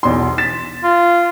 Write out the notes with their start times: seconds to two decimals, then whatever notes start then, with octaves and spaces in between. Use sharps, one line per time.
0.03 B1 E2 C6
0.38 A6 B6 E7
0.84 F4